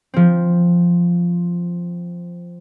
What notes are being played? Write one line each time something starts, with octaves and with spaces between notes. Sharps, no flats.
F3 C4